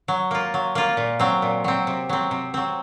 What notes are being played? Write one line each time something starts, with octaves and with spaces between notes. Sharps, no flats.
F#3
A#3 F4
F#3
A#3 F4
A#2
F#3 C4
A#2
F#3 C4
C3
F#3 C4
C3
F#3 C4